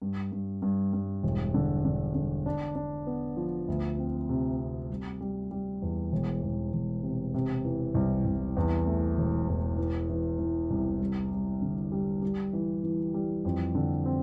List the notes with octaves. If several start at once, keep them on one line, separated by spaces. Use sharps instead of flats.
G2
G2
G2
G2
E1
D3
D3
D3
D4
D4
B3
F3
D2
C4
C3
C4
G3
G3
G3
E2
E1
E1
E1
C3
C3
E3
C2
C2
E2
A3
E1
E2
E3
E3
E3
C2
G3
G3
D3
G3
G3
E3
E3
G3
F2
D3
C4